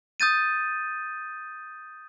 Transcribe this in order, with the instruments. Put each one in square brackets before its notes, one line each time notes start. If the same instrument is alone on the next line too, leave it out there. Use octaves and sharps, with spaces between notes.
[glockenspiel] D#6 G6 A6 D#7